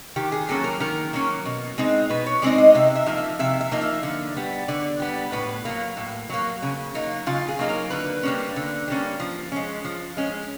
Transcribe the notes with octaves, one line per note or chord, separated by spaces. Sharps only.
D#3 G4
G#4
F#3 A#3 C#4 A4
A#4
D#3 A#4
F#3 A#3 C#4
B2
G#3 C4 D#4
B2 B4
C#5
G#3 C4 D#4 D5
D#5
C3 E5
E5
F3 A#3 D#4
E5
C3 E5
E5
F3 A#3 D#4
E5
D3
G3 B3
D3 D5
G3 B3
A2 B4
F#3 A#3
A2
F#3 A#3
C#3
F#3 A#3 D#4
C#3 F4
G#4
F#3 A#3 D#4
A#4
D3 B4
G3 A#3 C#4
D3
G3 A#3 C#4
F3
G#3 C#4
F3
G#3 C#4